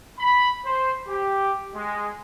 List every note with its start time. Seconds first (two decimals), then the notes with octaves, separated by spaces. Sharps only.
0.19 B5
0.65 C5
1.07 G4
1.76 G#3